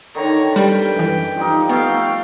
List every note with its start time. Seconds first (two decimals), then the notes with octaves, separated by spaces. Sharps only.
0.15 D3 D#3 C#5 A#5
0.56 G3 B4 G5
0.96 F#2 E3
1.37 F3 G3 D#4
1.69 A3 B3 F5 G5